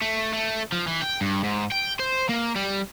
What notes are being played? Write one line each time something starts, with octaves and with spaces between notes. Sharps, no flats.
A3
A3
F3
E3
G5
G2
G#2
G5
C5
A#3
G3